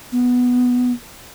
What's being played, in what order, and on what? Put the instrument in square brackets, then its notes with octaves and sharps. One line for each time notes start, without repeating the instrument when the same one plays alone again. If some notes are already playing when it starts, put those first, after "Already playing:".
[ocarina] B3